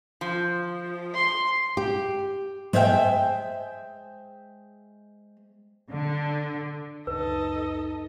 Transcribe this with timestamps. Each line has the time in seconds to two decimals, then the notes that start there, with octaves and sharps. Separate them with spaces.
0.21 F3
1.15 C6
1.77 G4
2.73 G#3 C5 E5 F5 G5
5.90 D3
7.07 C#2 F#2 C#3 D#4 A4 B4 D#5